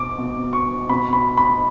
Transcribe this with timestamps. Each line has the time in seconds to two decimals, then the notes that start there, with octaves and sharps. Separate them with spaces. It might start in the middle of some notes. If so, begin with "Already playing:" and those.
Already playing: B2 D6
0.18 B2
0.53 C#6
0.89 B2 B5
1.13 B5
1.37 B5